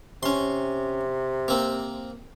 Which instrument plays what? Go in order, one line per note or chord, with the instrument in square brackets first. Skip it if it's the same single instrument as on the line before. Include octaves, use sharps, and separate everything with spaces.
[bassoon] C3 [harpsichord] C#4 C6
[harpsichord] A#3 C4